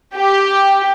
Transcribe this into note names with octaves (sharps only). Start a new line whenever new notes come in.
G4